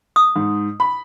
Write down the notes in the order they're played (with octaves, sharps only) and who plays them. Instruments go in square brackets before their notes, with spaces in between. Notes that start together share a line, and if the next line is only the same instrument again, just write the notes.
[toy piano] D#6
[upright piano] G#2
B5